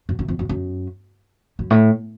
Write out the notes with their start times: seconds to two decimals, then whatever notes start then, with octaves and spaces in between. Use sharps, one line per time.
0.09 F#2
0.19 F#2
0.28 F2
0.39 F#2
0.49 F#2
1.59 F#2
1.70 A2